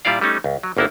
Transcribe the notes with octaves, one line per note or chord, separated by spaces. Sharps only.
A#2 G3 E4 F4 D5 F5
G3 A3 C#4 D#4
C#2
F#3
G1 D2 A#3 B3 E4